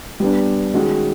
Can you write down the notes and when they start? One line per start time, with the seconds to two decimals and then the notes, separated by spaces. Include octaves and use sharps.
0.20 G3 B3 D4
0.74 D#3 G#3 C#4 F#4